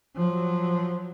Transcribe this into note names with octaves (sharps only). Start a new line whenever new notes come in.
F3 F#3